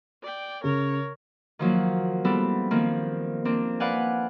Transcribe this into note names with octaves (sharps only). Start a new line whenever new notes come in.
D5 G5
C#3 A#4 C#5
D#3 F3 F#3 A#3
G3 B3 C4 E4 A4
D#3 F3 A#3 C4
A#3 C4 D4
B4 D5 F5 F#5 G#5